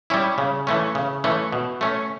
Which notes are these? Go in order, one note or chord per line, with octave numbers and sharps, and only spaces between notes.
G3 C#4 E4
C#3
E3 A3 C#4
C#3
E3 A3 C#4
B2
A3 C#4